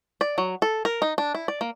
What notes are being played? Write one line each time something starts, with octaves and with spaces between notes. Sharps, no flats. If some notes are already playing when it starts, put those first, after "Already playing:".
D5
F#3
A4
A#4
D#4
D4
E4
D5
A#3